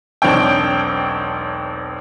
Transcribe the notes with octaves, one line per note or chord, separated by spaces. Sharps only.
E1 B1 C4 D4 C#5 G5